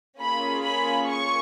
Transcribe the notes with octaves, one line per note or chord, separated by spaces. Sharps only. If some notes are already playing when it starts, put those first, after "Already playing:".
A#3 C#4 F4 G#4 B5
B5
C#6